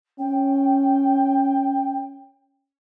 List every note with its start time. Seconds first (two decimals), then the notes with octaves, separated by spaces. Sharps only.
0.18 C#4 G5